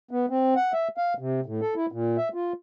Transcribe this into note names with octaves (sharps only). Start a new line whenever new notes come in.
B3
C4
F#5
E5
F5
C3
A2
A4
E4
A#2
E5
F4